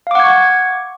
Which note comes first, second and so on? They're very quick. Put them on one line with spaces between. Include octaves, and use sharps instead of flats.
F5 D6 F#5 G#6 C#6